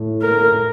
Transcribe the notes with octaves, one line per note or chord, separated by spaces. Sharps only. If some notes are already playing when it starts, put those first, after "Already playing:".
Already playing: A2
A#4
A2